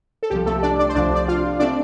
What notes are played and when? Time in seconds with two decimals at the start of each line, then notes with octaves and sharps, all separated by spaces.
0.23 A4
0.30 C2 C3 F3 G4
0.46 A3 A4
0.63 D4 D5
0.79 D4 D5
0.89 C5
0.95 C2 C3 F3 D4 D5
1.15 D5
1.28 F4 F5
1.60 C3 A3 C4 D4 D5